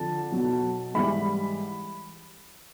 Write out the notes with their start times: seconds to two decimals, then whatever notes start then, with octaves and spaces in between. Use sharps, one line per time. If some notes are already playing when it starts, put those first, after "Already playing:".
Already playing: F2 D3 F3 A5
0.32 B2 F#3
0.95 G#2 E3 G3 B5